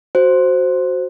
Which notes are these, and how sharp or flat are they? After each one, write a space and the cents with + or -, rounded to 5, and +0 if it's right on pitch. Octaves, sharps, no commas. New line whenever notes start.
F#4 +0 C5 +0